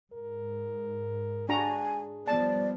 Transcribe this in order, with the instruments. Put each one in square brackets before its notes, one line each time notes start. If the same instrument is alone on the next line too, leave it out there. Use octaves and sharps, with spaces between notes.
[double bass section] G#2 [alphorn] A#4
[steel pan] D4 F#4 A#5 [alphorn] G#4 [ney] G#5
[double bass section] F3 G3 B3 [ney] D5 [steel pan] A5